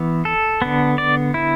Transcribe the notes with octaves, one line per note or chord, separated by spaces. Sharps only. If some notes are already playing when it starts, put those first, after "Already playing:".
Already playing: E3 B3
A4
D3 B3
D5
E4